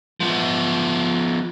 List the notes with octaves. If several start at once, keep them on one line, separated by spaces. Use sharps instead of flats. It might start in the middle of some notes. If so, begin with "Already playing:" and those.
F3 B3